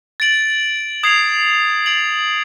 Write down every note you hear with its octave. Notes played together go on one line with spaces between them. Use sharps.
A6 D7 F#7
D#6 G#6 C7 F7
A6 D7 F#7